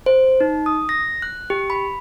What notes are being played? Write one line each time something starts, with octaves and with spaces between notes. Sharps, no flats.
C5
D#4
D#6
A#6
F#6
G4
B5